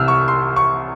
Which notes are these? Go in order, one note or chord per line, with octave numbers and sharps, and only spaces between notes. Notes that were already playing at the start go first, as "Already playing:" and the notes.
Already playing: C2 C3 E3 E6 F6
C#6
C6
C#6